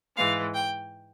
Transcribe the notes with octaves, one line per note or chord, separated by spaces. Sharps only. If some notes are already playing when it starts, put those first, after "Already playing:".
G#2 E3 G#3 F5
G5